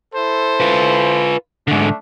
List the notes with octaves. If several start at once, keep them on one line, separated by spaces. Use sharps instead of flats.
E4 A4 C5
F4 B4
G#2 D3 A3 D4